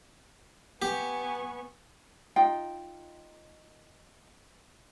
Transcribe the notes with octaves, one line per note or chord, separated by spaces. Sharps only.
B3 G4 G#5 C#6
D#4 F4 G5